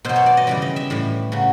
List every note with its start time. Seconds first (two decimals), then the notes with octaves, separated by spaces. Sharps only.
0.05 B2 F#3 C5
0.16 C#5
0.26 D5
0.37 D#5
0.47 C#3 E3 G3 D5
0.62 D#5
0.76 E5
0.90 A2 E3 G3
1.32 C#3 F#3